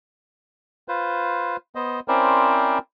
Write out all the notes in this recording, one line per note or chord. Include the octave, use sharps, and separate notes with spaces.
F4 B4 C5
B3 C5 D#5
C4 C#4 E4 A#4 C5 D5